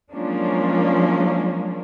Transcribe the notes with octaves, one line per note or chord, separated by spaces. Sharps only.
F3 F#3 G#3 A#3 C#4 D4